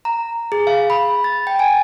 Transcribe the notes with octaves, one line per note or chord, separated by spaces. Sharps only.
A#5
G#4
F5
B5
A6
G5
G#5